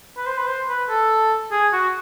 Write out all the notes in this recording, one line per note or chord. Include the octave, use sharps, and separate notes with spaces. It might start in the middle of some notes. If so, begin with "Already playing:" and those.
B4
C5
B4
C5
B4
A4
G#4
F#4